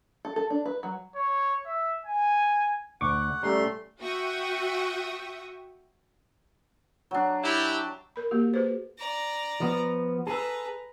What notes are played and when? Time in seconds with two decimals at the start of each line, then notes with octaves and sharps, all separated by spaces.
0.25 A4
0.36 A4
0.50 D4
0.66 B4
0.83 F#3
1.15 C#5
1.66 E5
2.05 G#5
3.01 D2 F#5 C#6 D6
3.43 G3 A3 C#4 D5 A#5 C6
4.00 F#4 E5 G5 C#6 D#6
7.11 F#3 D4
7.43 E4 G4
8.16 A#4 B5
8.31 A#3 F#4 G4
8.54 F#4 G#4 B4 C5
8.98 D5 A#5
9.60 F3 B3
10.27 G#4 A4 B4 A#5